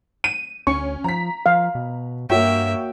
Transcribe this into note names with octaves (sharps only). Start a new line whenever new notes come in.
D#7
D2 C#4 C#6
F3 A#5 B6
F3 F5
B2
G2 A#3 F#4 C#5 E5 G5